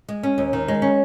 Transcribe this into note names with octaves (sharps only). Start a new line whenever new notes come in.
G#3
C#4
D#2
D#3
G#3
C#4